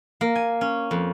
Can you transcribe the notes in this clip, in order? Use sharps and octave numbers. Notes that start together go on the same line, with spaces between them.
A#3
G#5
C#4
F2